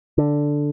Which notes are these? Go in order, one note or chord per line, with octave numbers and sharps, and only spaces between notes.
D3